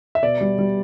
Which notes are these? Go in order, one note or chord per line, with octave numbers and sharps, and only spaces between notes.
E5
B2 D5
G3
G3